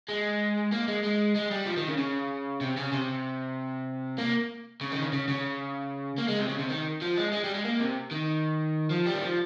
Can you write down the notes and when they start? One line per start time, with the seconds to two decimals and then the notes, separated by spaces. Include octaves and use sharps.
0.08 G#3
0.72 A#3
0.88 G#3
1.03 G#3
1.35 G#3
1.51 G3
1.66 F3
1.77 D#3
1.88 C#3
1.98 C#3
2.61 C3
2.77 C#3
2.92 C3
4.18 A#3
4.81 C#3
4.92 D#3
5.02 C#3
5.13 C#3
5.29 C#3
6.18 A#3
6.28 G#3
6.39 C3
6.49 C#3
6.59 C3
6.70 D#3
7.01 F3
7.17 G#3
7.32 G#3
7.44 G3
7.54 G#3
7.65 A#3
7.80 C3
8.11 D#3
8.90 F3
9.06 G3
9.14 D#3
9.22 F3